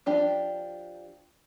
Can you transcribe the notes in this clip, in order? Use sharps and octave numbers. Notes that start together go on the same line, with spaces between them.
F3 D4 G4